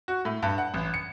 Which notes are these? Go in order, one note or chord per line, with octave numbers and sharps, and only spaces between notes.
F#4
A2
G2
F#5
A1
C#7